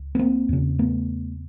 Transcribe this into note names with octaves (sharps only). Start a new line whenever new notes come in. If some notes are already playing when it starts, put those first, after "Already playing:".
Already playing: C#2
B3
A#3 C4
E2 C#3
A3 B3